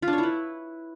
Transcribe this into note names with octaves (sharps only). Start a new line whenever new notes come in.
F4
D4
C#5
E4
B4